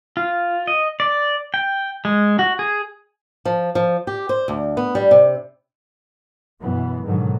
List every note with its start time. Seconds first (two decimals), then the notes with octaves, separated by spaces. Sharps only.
0.17 F4
0.67 D#5
1.00 D5
1.54 G5
2.05 G#3
2.39 F#4
2.59 G#4
3.45 F3
3.75 F3
4.07 G4
4.29 C5
4.48 D2
4.77 B3
4.95 G3
5.11 C3
6.60 F#2 B2 E3 B3
7.04 G#2 B2 D3 D#3 F#3